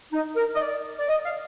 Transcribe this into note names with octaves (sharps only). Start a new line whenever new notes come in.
D#4
A#4
D#5
D5
D5
D#5
F5